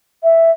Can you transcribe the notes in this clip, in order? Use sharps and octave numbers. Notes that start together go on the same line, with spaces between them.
E5